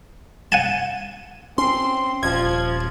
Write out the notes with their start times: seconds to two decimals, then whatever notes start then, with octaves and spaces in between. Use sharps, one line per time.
0.52 F#5 G#5 A5
1.58 C4 C#4 C6
2.23 D#1 F3 G#6